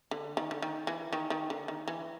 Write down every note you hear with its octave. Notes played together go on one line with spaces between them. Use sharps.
D3
D#3
D3
D#3
E3
D#3
D#3
D3
D#3
E3